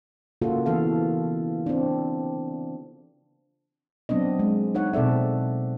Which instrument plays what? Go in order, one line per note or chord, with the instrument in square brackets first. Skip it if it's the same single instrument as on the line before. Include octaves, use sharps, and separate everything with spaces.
[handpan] C#3 A#3 F4 F#4 A4
E3 B3 A4 F5
C4 D4
F#3 B3 C4 D4 D#5
G#3
D#4 C#5 F#5
B2 C4 A4 D5 E5